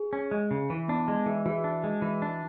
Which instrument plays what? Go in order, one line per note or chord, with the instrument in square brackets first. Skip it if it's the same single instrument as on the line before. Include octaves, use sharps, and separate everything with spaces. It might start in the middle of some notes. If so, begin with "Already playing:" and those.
Already playing: [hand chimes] G#4
[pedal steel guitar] C#4
G#3
C#3
[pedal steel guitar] E3 [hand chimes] E4
[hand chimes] B3 [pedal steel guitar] D4
[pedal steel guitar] G#3
[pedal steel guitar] E3 [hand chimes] G#4
[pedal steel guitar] E3 [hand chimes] F#4
[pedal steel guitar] D4
G#3
E3
D4